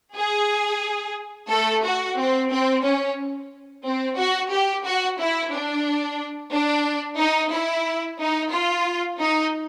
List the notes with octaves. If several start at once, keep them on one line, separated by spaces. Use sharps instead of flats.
G#4
A3 A4
F#4
C4
C4
C#4
C4
F#4
G4
F#4
E4
D4
D4
D#4
E4
D#4
F4
D#4